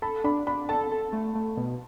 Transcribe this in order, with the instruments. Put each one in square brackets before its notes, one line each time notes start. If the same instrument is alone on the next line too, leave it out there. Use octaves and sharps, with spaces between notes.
[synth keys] A4 [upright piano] B5
[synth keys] D4 [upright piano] B5
[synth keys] D4 [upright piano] B5
[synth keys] A4 [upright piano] A5
[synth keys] A4
A3
A3
B2